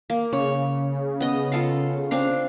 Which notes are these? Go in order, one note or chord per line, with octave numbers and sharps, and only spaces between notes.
A#3
C#3 C#5
B3 D#5
F4 A4 F5
C4 D4 F5